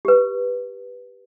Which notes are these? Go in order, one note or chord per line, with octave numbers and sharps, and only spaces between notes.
G4 B4